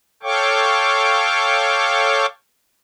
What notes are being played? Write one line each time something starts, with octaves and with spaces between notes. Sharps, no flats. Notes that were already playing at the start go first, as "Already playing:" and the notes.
A4 C#5 F5 G5 C#6 D6